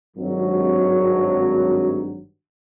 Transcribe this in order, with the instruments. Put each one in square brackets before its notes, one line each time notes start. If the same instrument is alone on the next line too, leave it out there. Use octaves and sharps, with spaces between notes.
[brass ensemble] G#1 G2 F#3